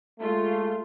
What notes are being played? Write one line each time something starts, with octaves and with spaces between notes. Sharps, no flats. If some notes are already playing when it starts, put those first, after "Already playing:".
G#3 A3 F4